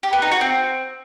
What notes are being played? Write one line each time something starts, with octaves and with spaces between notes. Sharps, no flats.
G4
B3
D#4
F#4
C4